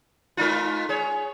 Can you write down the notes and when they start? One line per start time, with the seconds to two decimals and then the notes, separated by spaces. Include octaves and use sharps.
0.37 G#3 D#4 F4
0.89 G#4 C#5